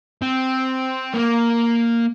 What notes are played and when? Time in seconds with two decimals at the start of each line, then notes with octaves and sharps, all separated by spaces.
0.22 C4
1.14 A#3